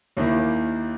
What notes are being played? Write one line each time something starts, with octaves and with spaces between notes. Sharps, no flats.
D#2 D#3 A#3 E4